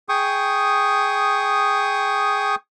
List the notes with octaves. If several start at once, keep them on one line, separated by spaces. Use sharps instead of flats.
G#4 G5 C#6 D#6